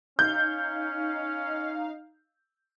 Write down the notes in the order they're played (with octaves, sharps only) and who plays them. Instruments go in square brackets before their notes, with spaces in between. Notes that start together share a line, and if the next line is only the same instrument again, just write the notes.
[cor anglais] C#4 [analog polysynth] D#4 F5 [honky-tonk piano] G6